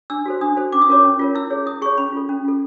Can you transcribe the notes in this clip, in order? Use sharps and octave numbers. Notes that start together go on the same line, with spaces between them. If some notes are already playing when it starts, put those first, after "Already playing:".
D4 E6
F#4 A4 C5
D4 D#6
F#4 A4 C5
C#4 D6
D#6
F4 A#4 C#5 D6
C#4
F4 A#4 C#5
E4 E6
G#4 C#5
E4 D#6
G#4 C#5 C#6
C#4 B5
F4 A4
C#4
F4 A4